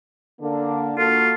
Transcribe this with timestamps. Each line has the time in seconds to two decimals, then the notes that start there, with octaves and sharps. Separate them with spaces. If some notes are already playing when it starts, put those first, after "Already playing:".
0.40 D3 A#3 D4
0.98 A#3 F4 F#4 A4